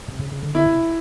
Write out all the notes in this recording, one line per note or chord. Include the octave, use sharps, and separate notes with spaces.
C3
C#3
C#3
D3
D3 E4
C3